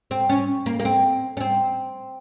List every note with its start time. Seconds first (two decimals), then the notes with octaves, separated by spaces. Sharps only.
0.11 C4
0.29 C#4
0.66 A#3
0.80 A#3
0.85 C4
1.37 C#4
1.40 C4